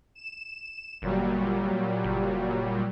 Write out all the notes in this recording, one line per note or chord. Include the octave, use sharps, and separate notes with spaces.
E7
G1 A#2 F#3 G3
F#1